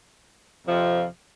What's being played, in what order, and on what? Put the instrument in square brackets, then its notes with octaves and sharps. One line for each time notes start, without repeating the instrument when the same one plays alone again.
[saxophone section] F2 C3 F3